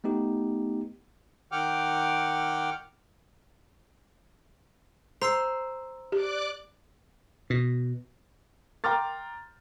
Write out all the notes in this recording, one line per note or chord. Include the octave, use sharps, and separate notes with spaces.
A3 B3 D#4 G4
D#3 F#5 G5 D6 F6
C5 A#5 E6 C7
G4 D5 D6 F#6
B2
G5 A#5 C6 D6 F6 A6